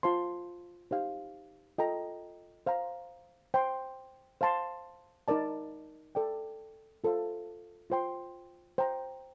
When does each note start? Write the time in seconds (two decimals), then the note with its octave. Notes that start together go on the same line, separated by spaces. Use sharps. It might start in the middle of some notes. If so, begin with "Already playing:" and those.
0.03 F4 C5 F5 A5 C6
0.91 D#4 G4 C5 F5
1.78 F4 A4 D#5 G5 A#5
2.66 C5 F5 A#5
3.54 C5 G5 C6
4.41 C5 F5 A5 C6
5.28 D#4 A#4 D5 A5
6.15 A4 D5 G5
7.04 F4 A4 C5 F5
7.90 F4 C5 G5 C6
8.78 C5 G5 A#5